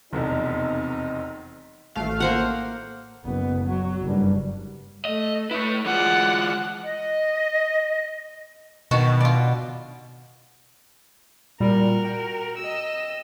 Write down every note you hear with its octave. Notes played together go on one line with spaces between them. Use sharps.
F1 B1 E2 C4 D#4
A1 A3 F5
A#3 C5 F#5
F#1 B3
F#3
F#1 G2
A3 D#5
A3 E4 B4
E3 G#3 F4 D5 F#5
D#5
B2 D#3 F#4 A5
F4 D5
A#2 G3 F#4 A#4
G5
D#5 E6